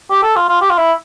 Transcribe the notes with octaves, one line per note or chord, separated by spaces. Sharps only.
G4
A4
F4
F4
G4
F4
E4